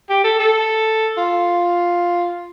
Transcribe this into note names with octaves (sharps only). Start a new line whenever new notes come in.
G4
A4
A4
F4